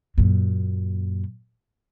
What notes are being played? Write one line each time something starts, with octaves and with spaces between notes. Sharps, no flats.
F#2 A#2